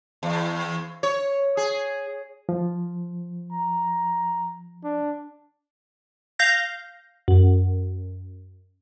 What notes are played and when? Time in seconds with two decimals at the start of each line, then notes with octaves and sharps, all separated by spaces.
0.23 E2
1.03 C#5
1.57 G#4
2.49 F3
3.52 A#5
4.84 D4
6.39 F5 G6 A#6
7.28 F#2